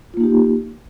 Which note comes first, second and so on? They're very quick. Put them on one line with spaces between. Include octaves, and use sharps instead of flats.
F4 A#3 D#4 G4